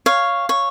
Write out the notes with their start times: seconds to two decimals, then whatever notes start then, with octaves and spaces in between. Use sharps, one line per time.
0.06 C#5 F5
0.49 C#5